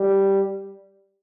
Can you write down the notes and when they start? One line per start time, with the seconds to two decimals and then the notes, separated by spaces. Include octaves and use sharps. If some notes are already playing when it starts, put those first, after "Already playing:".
Already playing: G3